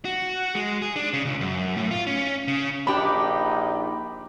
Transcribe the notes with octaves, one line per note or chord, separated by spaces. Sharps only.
F#4
G#3
G#4
D4
C#3
C#2
F#2
A2
F4
C#4
C#3
A#1 D4 D#4 G4 B5 D6